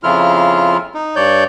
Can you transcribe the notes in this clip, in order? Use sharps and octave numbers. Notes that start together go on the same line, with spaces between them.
F2 C#3 F3 E4 F4 F6
D#4
G2 C#5 D5 G6